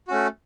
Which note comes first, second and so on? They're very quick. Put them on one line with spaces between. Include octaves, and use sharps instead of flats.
F#4 C#4 A3